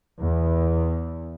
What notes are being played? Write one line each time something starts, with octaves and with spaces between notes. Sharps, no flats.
E2